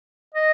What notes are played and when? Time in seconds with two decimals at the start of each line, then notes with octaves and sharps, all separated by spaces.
0.34 D#5